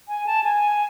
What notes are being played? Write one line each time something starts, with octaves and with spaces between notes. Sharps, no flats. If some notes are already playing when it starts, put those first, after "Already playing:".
G#5
A5
G#5